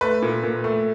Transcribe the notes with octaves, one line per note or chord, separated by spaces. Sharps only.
A3 B4
A#2
A#2
A3